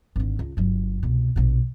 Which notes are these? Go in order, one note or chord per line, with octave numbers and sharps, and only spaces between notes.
G#1 D3
C#2
G1 F#3
C2 B2
A#1 B2